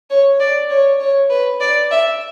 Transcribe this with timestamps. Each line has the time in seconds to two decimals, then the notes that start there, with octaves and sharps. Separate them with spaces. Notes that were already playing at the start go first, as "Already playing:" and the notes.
0.10 C#5
0.40 D5
0.70 C#5
1.00 C#5
1.30 B4
1.60 D5
1.91 E5